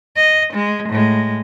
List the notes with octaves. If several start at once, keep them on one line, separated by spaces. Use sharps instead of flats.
D#5
G#3
A2 G#3